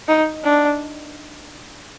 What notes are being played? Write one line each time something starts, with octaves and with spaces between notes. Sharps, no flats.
D#4
D4